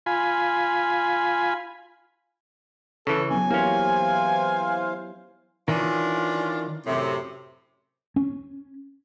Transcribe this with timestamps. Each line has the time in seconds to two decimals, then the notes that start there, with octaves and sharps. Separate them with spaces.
0.06 F4 G#5 B5
3.07 C#3 E3 A4
3.31 F#3 B3 C#4 G#5
3.51 E3 A#3 C#4 E4 G4 C5 C#5 F5
5.68 D#3 E3 C#4 D4 F4
6.86 F#2 A2 C3
8.16 C#4